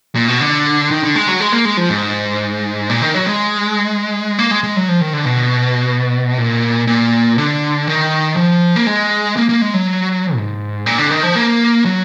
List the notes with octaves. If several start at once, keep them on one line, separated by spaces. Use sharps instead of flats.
A#2
B2
D3
D#3
D3
G#3
F#3
G#3
A#3
G#3
F3
G#2
A#2
D#3
F#3
G#3
A#3
G#3
G#3
F#3
F3
D#3
D3
B2
A#2
A#2
D3
D#3
F3
A#3
G#3
A#3
A#3
G#3
F#3
G#2
A#2
D3
D#3
F3
A#3
F#3